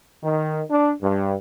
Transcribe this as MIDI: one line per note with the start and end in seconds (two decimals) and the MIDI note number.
0.23 0.62 51
0.70 0.92 62
1.02 1.35 43